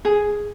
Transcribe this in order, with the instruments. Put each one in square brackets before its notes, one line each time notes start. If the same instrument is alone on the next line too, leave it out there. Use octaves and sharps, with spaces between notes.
[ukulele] G#4